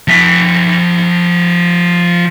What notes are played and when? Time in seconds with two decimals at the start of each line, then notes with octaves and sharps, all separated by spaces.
0.08 F3 E5